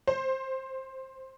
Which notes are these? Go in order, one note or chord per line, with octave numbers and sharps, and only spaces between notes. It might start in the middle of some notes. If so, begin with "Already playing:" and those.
C5